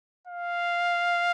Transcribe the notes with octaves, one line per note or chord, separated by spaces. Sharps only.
F5